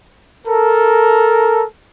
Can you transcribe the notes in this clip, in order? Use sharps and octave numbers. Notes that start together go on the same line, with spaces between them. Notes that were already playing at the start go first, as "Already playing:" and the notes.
A4 A#4